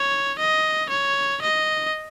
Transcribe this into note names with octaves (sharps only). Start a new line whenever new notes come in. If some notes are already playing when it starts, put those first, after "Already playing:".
Already playing: C#5
D#5
C#5
D#5